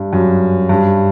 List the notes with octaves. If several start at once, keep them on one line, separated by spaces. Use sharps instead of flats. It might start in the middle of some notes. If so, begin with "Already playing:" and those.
Already playing: G2
F#2
G2